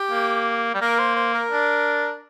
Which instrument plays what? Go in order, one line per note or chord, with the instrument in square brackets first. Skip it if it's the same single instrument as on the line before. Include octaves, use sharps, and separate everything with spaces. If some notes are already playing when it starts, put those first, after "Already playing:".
Already playing: [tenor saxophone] G4
[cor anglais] A#3
G3
[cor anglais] A#3 [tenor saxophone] A#4
[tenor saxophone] C5
C5
A#4
[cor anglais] D4